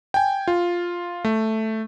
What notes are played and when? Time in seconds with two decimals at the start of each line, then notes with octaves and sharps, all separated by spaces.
0.14 G5 G#5
0.48 F4
1.25 A3